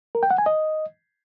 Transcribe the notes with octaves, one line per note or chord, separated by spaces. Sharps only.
A#4
G5
F#5
G#5
D#5